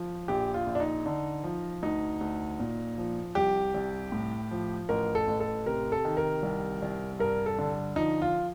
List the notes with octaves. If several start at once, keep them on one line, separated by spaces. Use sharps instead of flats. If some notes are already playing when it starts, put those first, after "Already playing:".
Already playing: F3
A#1 G4
F4
A#1
D4
D#4
D3
F3
D2 D#4
D2
A#2
F3
C2 G4
C2
A2
F3
A1 A#4
A4
A1
A4
C3 A#4
A4
D#3
A#4
C2
C2
G2 A#4
A4
D3
F3 D#4
F4